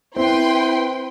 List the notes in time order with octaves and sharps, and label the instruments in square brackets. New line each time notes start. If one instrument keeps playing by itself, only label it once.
[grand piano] C4 [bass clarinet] E4 [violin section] B4 G5 C6